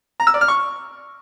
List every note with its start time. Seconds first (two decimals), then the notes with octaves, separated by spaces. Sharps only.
0.20 A#5
0.27 E6
0.34 D5
0.41 F6
0.48 C#6